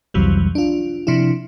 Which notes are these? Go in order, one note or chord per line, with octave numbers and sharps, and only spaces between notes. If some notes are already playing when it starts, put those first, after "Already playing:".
C2 F2 C3 E3 F#3 G3
D4 F4
C3 F3 D4 E4